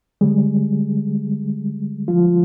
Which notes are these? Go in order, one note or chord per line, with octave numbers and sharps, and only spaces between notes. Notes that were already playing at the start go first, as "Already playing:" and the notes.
D3 G3 G#3 G#4
F3 F4